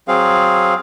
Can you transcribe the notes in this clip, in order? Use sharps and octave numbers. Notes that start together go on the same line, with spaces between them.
F#3 C4 G#4 F5